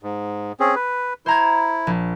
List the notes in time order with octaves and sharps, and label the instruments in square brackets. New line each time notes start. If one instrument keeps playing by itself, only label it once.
[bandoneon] G#2
C4 C#4 G#4
B4
[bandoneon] E4 [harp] C5 A#5 G#6
[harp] A#1